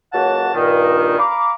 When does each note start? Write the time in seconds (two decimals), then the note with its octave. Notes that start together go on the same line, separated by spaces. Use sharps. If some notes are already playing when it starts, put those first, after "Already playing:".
0.13 C#2 F#3 A#3 F#4 F#5 A5
0.54 G2 A#2 D#3
1.18 F5 A#5 B5 D6